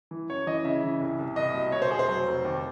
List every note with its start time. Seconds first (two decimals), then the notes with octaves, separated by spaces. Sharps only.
0.11 E3
0.29 F#2 C#5
0.47 E3 D#5
0.65 C#3 E5
0.84 E3
1.01 C2
1.19 C2
1.36 C2 D#5
1.54 B2
1.72 B2 C#5
1.82 C5
1.90 F1 G#4
1.99 C5
2.09 F#3
2.27 F1
2.45 D#2